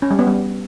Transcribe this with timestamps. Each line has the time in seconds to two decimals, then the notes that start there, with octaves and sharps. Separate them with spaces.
0.02 C#4
0.11 G3
0.19 B3
0.27 G3